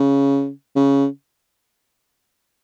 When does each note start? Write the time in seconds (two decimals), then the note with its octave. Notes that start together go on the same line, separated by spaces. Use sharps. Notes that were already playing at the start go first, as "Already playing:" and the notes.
Already playing: C#3
0.76 C#3